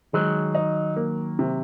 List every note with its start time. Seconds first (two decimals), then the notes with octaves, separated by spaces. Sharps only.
0.13 D#3 F#3 G#3
0.55 D#4
0.96 A#3
1.39 C3